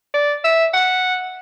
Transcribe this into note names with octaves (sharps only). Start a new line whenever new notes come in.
D5
E5
F#5